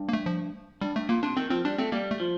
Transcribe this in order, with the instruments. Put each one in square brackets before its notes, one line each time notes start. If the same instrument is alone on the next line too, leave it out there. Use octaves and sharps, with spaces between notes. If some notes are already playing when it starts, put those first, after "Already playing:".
Already playing: [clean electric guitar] G2
[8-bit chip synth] A#3
A3
F3
[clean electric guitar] G2 [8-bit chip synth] G3
[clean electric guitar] G2 [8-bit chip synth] A3
[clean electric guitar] A#2 [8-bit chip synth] A#3
[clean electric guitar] C3 [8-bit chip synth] D4
[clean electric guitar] D#3 [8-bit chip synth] C4
[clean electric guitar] F3 [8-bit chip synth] C4
[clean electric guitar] G3 [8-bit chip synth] D4
[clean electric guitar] A3 [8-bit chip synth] C4
[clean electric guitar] G3 [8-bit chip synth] A#3
[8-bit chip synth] A3
[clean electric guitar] F3